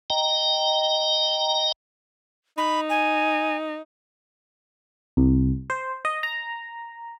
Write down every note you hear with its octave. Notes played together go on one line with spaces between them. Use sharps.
D#5 G5 A#5
D#4 B5
G#5
C2
C5
D#5
A#5